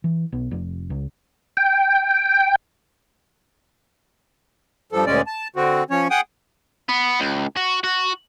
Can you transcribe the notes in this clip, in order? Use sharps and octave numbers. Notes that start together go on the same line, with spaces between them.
E3
B1
F1
C#2
G5
G2 F3 A4
D2 A#2 G#3 C#4 D5
A5
D3 C4 F#4
F3 C#4 C#5
G#4 F#5 G5 D#6
B3
C#2
F#4
F#4